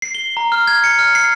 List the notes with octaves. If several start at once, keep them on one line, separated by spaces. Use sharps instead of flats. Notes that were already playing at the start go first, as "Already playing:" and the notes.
C7
G7
A#5
F6
G#6
C#7
F6
C7